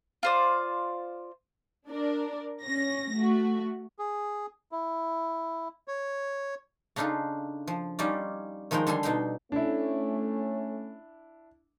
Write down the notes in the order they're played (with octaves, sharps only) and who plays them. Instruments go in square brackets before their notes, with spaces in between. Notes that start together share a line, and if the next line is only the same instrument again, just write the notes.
[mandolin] F4 C5 D5
[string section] D4 A#4 D5
C#4 A#6
A3 F#4
[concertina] G#4
E4
C#5
[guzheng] C#3 D4 D#4 F4 A4
F3
G3 C#4 D#4 F4 D5
D#3 F3 G#3 A#4 G5
D3 G3 A4 G#5 C6
B2 D#4 G5 C6
[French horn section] A3 C#4 [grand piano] D4 E4